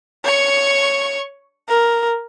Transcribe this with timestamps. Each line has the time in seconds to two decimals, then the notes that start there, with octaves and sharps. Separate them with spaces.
0.25 C#5 C#6
1.68 A#4